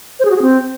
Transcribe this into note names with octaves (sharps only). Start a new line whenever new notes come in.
C5
G#4
F#4
G#4
C4